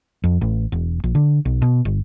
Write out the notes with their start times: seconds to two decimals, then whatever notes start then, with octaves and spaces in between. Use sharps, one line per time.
0.24 F2
0.41 A1
0.72 E1
1.04 A#1
1.15 D3
1.45 B1
1.62 B2
1.85 G1